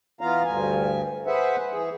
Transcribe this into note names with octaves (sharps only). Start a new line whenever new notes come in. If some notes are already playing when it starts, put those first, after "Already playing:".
E3 B3 F4 F5 A#5
D2 G2 G#5
G#4 B4 C5 E5 F#5
E3 G#4